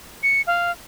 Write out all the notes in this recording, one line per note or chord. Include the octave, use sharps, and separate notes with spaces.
C#7
F5